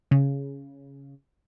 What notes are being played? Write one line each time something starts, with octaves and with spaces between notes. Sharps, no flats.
C#3